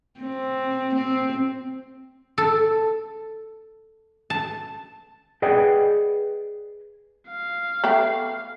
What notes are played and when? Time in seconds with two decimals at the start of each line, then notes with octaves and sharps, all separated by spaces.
0.20 C4
0.95 C4
2.38 A4
4.30 A5
5.42 G#4 B4 D5 D#5 F#5 G5
7.28 F5
7.84 A3 B3 G4